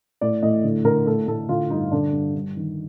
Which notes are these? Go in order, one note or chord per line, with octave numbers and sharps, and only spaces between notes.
A2 D5
A2 D#5
D3
D3 A#4
A2 A4
A2 A4
D3 F4
G2 D#4
D3 D4
G2
G2
D#3